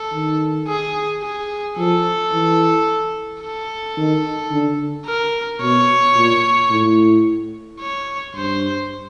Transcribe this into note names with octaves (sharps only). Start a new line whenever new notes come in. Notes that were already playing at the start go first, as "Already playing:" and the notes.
Already playing: A4
D#3
G#4
G#4
F3 A4
E3
A4
D#3
D3
A#4
B2 C#5
A#2
A2
C#5
G2 C5